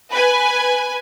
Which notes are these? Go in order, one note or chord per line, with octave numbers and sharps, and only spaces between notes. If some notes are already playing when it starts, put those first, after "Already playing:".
B4 G#5